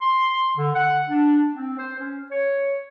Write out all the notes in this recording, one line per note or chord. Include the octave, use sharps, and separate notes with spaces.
C6
D3
F#5
D4
C4
C5
C#4
C#5